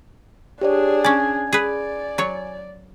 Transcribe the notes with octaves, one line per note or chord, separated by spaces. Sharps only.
D4 G4 G#4 C#5 D5
C#4 D5 G#5 G#6
G#4 B4 D5
F#3 C#5